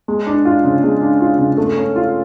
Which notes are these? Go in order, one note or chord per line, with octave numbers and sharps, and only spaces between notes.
G#3
D4
F4
C#3
G#3
D4
F4
C#3
A3
C#4
F4